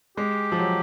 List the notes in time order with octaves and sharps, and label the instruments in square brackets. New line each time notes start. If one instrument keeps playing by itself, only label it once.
[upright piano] G#3 [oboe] G4
[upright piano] F3
F#3